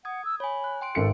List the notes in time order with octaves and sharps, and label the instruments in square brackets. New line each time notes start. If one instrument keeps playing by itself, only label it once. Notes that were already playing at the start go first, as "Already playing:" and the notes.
[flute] F#5 [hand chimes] D#6 G#6
[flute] E6
[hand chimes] C#5 G#5 [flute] B5
[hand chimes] F#6
G5 C6 D7
[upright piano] G#1 C#7 [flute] A4